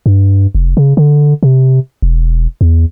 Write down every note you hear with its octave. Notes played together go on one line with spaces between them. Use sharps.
G2
F1
C#3
D3
C3
E1
E2